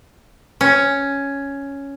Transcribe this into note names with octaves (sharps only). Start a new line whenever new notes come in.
C#4